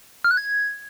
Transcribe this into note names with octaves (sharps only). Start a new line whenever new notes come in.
F6
F#6
G#6